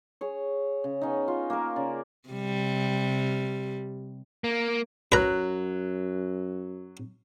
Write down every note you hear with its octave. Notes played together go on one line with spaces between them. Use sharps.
G#4 C#5
C#3
B3 C#4 D#4
F4
A#3 A#4
C#3 D5
C3 G3
A#3
F#2 F#3 B4 A#5 F#6